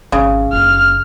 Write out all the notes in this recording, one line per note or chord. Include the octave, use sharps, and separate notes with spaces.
G#1 C#3
F#1 F6